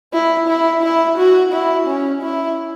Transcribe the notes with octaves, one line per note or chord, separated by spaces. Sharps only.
E4
E4
E4
F#4
E4
C#4
E4